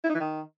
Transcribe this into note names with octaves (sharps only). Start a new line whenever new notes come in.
E4
D#4
E3
D#3